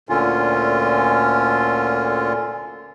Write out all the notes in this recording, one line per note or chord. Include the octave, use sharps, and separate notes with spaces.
D2 A#2 D3 C#4 F4